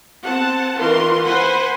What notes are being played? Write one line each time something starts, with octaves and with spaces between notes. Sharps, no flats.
C4 F#5 A5
D#3 E3 F4 A#4 B4 C6
B4 C5 F#5 G#5 B5 C6